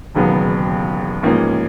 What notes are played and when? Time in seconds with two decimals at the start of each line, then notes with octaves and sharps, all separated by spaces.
0.15 E1 D#2 C#3 F#3 B3
1.23 A1 G#2 F3 A#3 C#4